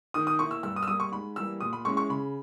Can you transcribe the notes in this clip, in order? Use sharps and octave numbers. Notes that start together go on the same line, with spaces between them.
D#3 D#6
D#6
A#3 E4 C#6
E6
G2 E6
D#6
E6
G3 A#3 D#6
C#6
G#2 B5
E3 G3 A#3 E6
A#2 D#6
B5
G#3 C#4 E4 C#6
C#6
C#3 B5